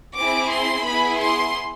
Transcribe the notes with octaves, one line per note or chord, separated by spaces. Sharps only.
C4 E4 G#4 D6
C6
B3 E4 G#4 B5
C6